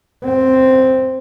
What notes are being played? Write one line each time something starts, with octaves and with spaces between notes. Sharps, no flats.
C4